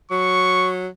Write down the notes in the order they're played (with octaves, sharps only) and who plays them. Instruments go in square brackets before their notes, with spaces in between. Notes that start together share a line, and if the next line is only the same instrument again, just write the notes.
[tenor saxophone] F#3 [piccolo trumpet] C#6